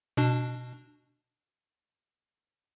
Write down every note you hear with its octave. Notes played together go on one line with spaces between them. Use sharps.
B2 D4